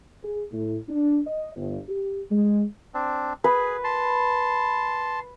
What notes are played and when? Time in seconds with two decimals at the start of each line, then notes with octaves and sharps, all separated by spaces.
0.23 G#4
0.52 A2
0.89 D4
1.26 D#5
1.56 G1
1.88 G4
2.31 G#3
2.94 C4 D4
3.44 G#4 B4
3.84 A5 C6